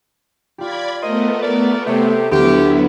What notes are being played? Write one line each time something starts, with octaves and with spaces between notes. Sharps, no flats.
F4 G4 D5 B5 G#6
A3 B3 A#4 C5 D#5
A#4 D5
C3 G4 A4 C#5
D2 F#3 B3 E4 G4